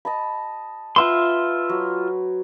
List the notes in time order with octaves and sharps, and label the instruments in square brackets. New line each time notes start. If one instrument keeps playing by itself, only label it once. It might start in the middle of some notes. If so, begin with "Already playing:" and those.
[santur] D#5 A5 B5
[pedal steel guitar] F4 E5 C6 [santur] B4 C5 F#5
[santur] F#3